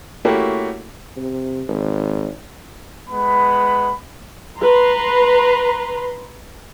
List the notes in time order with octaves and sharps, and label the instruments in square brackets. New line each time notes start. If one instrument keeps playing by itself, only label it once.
[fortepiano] A3 A#3 C#4 E4 F#4 G4
[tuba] C3
G#1
[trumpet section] G#3 B3 B5
[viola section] B4 A#5 C6